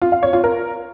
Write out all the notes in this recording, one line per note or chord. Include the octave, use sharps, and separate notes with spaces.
F4
F5
C#5
F4
A#4